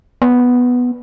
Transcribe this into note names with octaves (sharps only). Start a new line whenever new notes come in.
B3